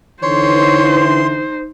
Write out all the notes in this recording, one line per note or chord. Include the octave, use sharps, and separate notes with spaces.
D3 E3 D#4 C5 C#5 C6